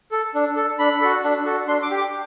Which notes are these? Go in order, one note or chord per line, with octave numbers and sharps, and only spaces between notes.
A4
D4
A4
D4 B5
F#4 A4
D4
F#4 A4
D4 C6
D6
G4
D6